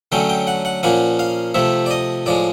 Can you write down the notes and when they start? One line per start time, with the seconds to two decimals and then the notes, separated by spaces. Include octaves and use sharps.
0.12 D3 F#3 A3 C#4 G5
0.29 G5
0.47 F#5
0.65 F#5
0.83 A#2 F3 A#3 C#4 F#5
1.19 F5
1.54 C3 F3 A3 E5
1.86 D5
1.91 D#5
2.26 A2 F3 G#3 D5